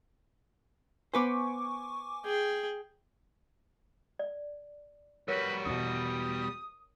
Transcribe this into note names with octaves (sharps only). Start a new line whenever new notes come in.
B3 B4 C5 G#5 C#6 D6
G#4 G5
D5
G3 F#4 A#4 B4 C#5
E2 B2 D#6